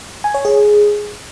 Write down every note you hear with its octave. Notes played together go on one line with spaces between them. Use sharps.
G#5
C#5
G#4